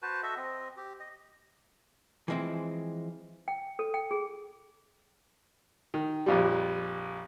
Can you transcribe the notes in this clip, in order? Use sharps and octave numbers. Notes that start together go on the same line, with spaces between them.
F#4 B4 C5 A5
F#4 A4 D#5 E5
C4 D#5
G4
D#5
E3 F3 G#3 C4 E4
G5
A4
G5
G#4
D#3
A#1 F2 G3